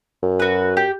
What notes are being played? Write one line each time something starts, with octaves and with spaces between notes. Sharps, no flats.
F#2
F#4 B4
G4